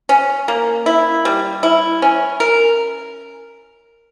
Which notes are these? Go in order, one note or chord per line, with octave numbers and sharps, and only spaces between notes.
C#4
A#3
E4
G3
E4
C#4
A#4